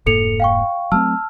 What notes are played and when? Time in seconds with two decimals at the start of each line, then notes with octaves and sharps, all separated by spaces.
0.06 F1 G#2 A#3 A4 C#7 F7
0.40 F5 G5 C#6
0.92 F#3 A3 C4 A5 E6 F6